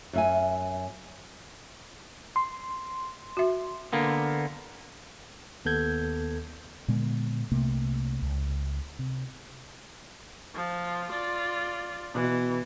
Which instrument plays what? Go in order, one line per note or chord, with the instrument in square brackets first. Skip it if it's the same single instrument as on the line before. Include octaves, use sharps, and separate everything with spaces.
[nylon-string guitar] F#2 E5 G#5
[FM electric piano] C6
[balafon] F#4 E5
[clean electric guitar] D3 A#3 B3
[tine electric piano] D#2 B3 A4 G6 G#6
[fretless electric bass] A#2 D3 G#3 B3
C2 C3 A3 A#3
C#2
C3
[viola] F3 F4
F4 D5
[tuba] B2 [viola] E3